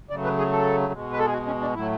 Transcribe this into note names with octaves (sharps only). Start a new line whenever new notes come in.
C#3 F#3 A3 D5
B4
G#4
A4
B2 G#3
B4
A4
G#4
F#4
C#4
D4
A2 F#3 A3 E4